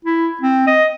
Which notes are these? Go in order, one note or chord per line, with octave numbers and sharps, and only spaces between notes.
E4
C4
D#5